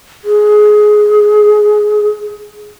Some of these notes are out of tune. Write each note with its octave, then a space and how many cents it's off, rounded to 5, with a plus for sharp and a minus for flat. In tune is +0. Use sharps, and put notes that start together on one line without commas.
G#4 +15